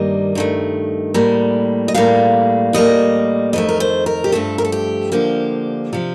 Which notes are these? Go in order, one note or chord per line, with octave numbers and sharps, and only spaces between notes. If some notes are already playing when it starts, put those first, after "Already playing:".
Already playing: G2 D#3 G3 A#3 D#5
G2 D#3 A3
A2 G3 A#3
D#5
A2 G3 A#3 F5
A2 G3 A#3 D#5
F2 D#3 A3 D#5
A#4
C5
A#4
G4
G2 F3 A3 A4
A#4
A4
G4
D2 D3 F3 A#3 G4
C3 F3 F4